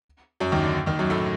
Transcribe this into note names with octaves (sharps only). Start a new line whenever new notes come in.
F#2 F#3
D#2 D#3
D3
D#2 D#3
F#2 F#3
A2 A3